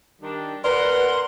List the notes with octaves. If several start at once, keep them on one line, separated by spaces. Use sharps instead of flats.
D#3 G3 D4
A#2 A#4 B4 D5 F#5 C6